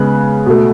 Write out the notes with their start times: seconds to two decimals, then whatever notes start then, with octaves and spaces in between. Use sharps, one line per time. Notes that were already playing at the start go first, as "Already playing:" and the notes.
Already playing: C#3 G#3 B3 F#6
0.46 B2 A3